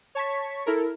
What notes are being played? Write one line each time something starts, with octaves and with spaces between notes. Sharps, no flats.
C#5 A5 C#6 B6
E4 A4 A#4